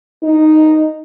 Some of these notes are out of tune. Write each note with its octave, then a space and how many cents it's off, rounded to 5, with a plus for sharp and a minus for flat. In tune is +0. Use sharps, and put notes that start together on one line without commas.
D#4 -5